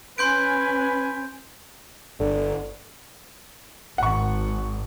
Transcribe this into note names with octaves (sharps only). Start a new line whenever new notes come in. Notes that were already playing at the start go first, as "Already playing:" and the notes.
C#4 B4 G#5 C6 G6 D7
G1 D3
G#1 F#5 C#6